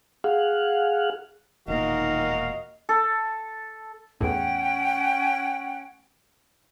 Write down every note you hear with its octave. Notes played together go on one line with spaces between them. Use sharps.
G#4 F5 F#5
E1 A#2 D#3 F#4 A#4 D#5 F5
A4
E2 A2 C#4 F#5 G5